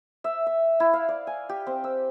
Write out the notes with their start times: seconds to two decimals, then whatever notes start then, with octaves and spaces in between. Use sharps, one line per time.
0.24 E5
0.46 E5
0.80 E4
0.93 F5
1.09 D5
1.27 G#5
1.49 G4
1.67 C4
1.84 E6